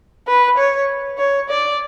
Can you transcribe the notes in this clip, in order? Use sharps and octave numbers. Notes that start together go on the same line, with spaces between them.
B4
C#5
C#5
D5